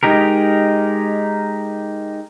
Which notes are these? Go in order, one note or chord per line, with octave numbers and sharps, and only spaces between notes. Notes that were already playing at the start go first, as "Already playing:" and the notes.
G#3 D#4 G4 A#4